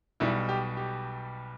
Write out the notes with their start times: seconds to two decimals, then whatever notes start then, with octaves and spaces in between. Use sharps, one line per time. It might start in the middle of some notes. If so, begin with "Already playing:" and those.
0.20 B1 B2 G3 E4
0.49 G4
0.77 G4